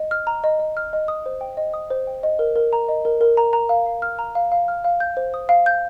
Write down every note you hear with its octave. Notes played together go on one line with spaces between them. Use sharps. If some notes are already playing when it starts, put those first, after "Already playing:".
Already playing: D#5
F6
A#5
D#5
D#5
F6
D#5
D#6
C5
G5
D#5
D#6
C5
G5
D#5
A#4
A#4
A#5
D#5
A#4
A#4
A#5
A#5
F5
F5
F6
A#5
F5
F5
F6
F5
G6
C5
D#6
F5
G6